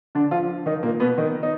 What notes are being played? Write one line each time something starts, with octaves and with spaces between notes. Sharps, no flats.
D3 D4
F3 F4
D#3 D#4
A#2 A#3
B2 B3
D#3 D#4
D#4